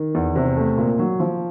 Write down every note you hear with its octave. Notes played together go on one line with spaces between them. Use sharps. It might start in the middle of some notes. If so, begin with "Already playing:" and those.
Already playing: D#3
E2
C3
A3
A#2
F#3
F3